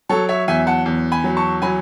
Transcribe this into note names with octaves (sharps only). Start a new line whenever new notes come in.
F#3 A4 C#5
C#5 E5
E2 E5 G#5
F#5 A5
E2
G#5 B5
F#3
A5 C#6
F#3 G#5 B5